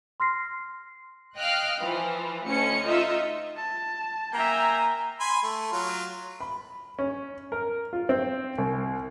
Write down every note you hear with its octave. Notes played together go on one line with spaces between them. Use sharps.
C6 F6 A#6 C7
D#5 F5 G5 F6 F#6
E3 F3
D2 A3 C#4 D#5 C#7
D#4 F4 D#5 E5
A5
A#3 E5 G5 G#5 A#5
G#5 B5 C6
A3
F#3 F4
B5
C#4
A#4
F4
C4
C2